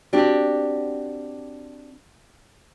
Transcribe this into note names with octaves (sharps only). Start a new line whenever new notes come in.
C4 D4 F#4 G4